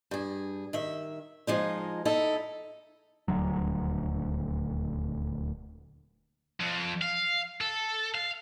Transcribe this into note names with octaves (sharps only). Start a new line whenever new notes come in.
G2 G#4
D#3 E5
F3 G#3 D#4
D#4 E4 A4
D#1 D2 F#3
F2
F5
A4
F5